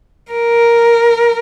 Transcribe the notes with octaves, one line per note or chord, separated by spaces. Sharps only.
A#4